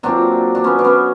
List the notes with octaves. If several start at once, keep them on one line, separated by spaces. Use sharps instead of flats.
A#2 F#3 C4 D4
D4
B3 C#4
D4
B3 C#4